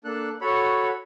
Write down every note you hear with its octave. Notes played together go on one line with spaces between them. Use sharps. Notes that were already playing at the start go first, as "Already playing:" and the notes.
A#3 D4 A4 F#6
F#4 A4 C#5 B5